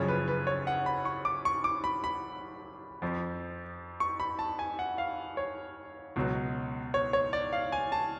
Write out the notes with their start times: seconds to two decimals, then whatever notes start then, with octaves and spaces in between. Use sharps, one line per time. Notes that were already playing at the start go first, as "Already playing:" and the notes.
Already playing: F#1 F#2 C#3 F3 C#5
0.08 B4
0.28 B4
0.47 C#5
0.67 F#5
0.86 B5
1.05 C#6
1.25 D6
1.45 C#6
1.64 D6
1.84 B5
2.04 B5
3.02 F2 F3
4.00 C#6
4.20 B5
4.39 A5
4.59 G#5
4.79 F#5
4.98 F5
5.37 C#5
6.16 C#2 B2 F#3
6.94 C#5
7.13 C#5
7.33 D5
7.53 F5
7.72 G#5
7.92 A5